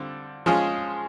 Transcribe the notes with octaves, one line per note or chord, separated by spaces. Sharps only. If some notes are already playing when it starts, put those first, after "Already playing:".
Already playing: D3 G3 C4 F4
F3 G#3 C#4 F4 G#4